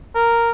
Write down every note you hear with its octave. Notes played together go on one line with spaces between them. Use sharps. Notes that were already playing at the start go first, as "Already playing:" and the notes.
A#4